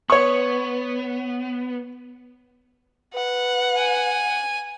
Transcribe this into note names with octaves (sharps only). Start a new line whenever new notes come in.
B3 C#5 C#6
B4 F#5
G#5